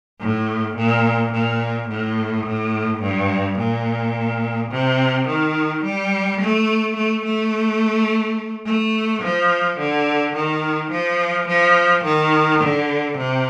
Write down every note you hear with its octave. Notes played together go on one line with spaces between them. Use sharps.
A2
A#2
A#2
A2
A2
G2
A#2
C3
D#3
G3
A3
A3
A3
A3
F3
D3
D#3
F3
F3
D#3
D3
C3